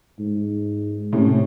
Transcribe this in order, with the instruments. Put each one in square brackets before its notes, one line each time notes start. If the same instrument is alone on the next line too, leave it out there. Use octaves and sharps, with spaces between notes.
[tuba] G#2
[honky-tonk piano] A2 C#4 [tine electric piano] C3